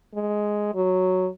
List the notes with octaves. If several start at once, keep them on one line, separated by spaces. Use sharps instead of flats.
G#3
F#3